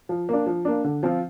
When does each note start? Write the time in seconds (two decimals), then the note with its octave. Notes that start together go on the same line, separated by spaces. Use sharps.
0.09 F3
0.29 A#3 D4
0.46 F3
0.65 A#3 D4
0.84 D3
1.03 F3 C4 F4